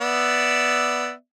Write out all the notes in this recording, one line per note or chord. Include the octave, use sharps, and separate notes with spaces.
B3 D5 E5